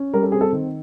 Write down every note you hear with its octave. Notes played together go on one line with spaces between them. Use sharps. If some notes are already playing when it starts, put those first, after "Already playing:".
Already playing: C#4
G3 A#4
A4
C4 G#4
A4
D#3